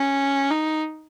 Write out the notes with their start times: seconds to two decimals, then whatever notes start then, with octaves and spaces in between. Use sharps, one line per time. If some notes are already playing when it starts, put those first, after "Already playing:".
Already playing: C#4
0.50 D#4